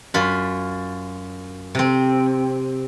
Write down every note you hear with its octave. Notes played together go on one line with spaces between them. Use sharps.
F#2 F4 B5
C3 C4